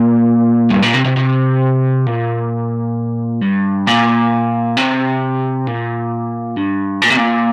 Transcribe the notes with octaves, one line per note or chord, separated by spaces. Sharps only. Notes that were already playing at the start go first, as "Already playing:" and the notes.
Already playing: A#2
G2
A#2
C3
C3
C3
A#2
G2
A#2
C3
A#2
G2
A#2
C3
A#2